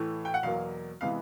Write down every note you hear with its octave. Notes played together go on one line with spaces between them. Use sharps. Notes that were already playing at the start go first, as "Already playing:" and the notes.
Already playing: A2 E3 A3
G5
F#5
E2 B2 F#3 A#3 F5
C3 E3 G#3 B3 F5